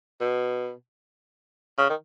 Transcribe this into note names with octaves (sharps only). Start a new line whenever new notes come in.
B2
C#3
D#3